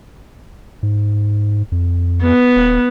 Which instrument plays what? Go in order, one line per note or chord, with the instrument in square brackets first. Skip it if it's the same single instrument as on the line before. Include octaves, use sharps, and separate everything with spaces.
[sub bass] G#2
F2
[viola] B3
[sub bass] D#1